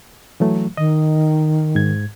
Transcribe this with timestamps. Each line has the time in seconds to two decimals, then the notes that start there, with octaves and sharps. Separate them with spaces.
0.40 E3 F#3 A3
0.77 D#3 D#5
1.75 G#2 G#6